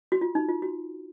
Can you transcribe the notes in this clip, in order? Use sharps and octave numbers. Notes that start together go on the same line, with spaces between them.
F#4
F4
D#4
F4
F#4